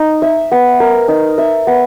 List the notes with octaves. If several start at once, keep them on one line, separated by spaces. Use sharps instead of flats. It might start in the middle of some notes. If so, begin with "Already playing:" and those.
Already playing: D#4
E5
B3
A#4
D#4
E5
B3